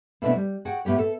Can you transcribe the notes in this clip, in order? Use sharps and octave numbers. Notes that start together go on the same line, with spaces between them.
B2 A3 B3 C4 D4 E4
G3
F#4 G#4 F#5 G5
A2 B3 G4 C#5
A4